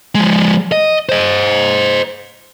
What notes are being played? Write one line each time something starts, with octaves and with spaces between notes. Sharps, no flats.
F3 G#3
D#5
C5 D#5